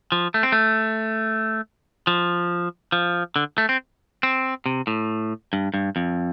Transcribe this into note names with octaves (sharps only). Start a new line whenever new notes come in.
F3
A3
C4
A3
F3
F3
D3
A3
C4
C4
C3
A2
G2
G2
F2